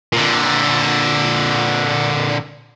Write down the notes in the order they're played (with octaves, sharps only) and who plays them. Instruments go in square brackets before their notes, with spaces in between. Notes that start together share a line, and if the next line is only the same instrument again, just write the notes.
[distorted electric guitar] A#2 D3